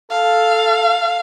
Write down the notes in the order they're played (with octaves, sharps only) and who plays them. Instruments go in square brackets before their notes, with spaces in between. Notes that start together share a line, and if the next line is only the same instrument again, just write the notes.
[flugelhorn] A4 [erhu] F5